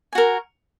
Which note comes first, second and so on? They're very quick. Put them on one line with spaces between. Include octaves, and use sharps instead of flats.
G#5 F#4 A#4